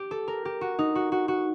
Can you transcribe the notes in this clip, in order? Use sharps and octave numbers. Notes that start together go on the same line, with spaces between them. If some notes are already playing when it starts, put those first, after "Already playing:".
Already playing: G4
A4
A#4
G4
F#4
D#4
F#4
F#4
F#4